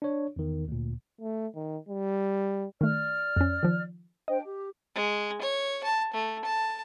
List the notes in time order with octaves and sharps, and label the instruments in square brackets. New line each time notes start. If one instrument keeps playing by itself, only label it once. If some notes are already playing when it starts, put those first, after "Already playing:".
[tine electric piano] D4 C#5
E2 D#3
D2 A#2
[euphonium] A3
D#3
G3
[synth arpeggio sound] D#3 A3 [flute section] D5 F6
[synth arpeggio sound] F2 C#4
D#3 F3
[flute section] D4 C5 G5 [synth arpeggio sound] D#5
[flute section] G4
[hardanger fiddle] G#3
C#5
A5
A3
A5